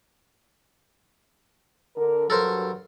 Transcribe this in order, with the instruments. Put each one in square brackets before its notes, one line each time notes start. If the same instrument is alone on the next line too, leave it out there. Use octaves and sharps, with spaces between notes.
[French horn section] D3 A#4
[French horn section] G2 F#3 [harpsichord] A4 A#4 C5